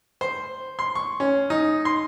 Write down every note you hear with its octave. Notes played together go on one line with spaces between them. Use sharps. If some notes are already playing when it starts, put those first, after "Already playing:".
C5
C6
C#6
C#4
D#4
C6